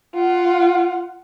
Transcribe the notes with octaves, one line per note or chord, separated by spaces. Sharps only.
F4 F#5